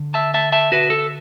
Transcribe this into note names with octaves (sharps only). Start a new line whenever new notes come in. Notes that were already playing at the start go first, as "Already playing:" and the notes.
Already playing: D3
E5 A5
E5 A5
E5 A5
F#4 B4
A4